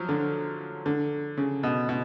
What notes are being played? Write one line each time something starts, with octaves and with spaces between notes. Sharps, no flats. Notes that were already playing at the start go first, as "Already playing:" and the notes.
Already playing: F3 F#3
D3
D3
C#3
B2
B2